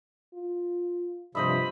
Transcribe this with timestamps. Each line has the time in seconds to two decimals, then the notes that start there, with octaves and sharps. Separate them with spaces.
0.34 F4
1.35 G2 C3 F3 C5 D#5 E5 B5